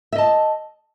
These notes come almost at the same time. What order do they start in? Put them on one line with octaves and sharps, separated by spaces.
E5 D#5 A5